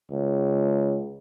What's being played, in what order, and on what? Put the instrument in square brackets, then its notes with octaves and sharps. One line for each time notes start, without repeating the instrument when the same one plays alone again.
[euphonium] C#2